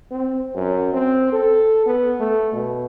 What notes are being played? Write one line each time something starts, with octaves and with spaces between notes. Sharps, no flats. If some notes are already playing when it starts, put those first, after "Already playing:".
C4
F#2
C4
A4
B3
A3
B2